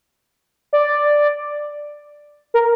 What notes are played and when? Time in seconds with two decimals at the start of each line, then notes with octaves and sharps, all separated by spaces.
0.73 D5
2.54 A#4